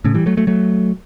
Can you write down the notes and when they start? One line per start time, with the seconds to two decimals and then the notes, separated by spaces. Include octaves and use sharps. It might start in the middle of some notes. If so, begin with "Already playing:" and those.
0.05 A2 C#3
0.14 E3 G3
0.26 F#3 A3
0.37 F#3 A3
0.47 F#3 A3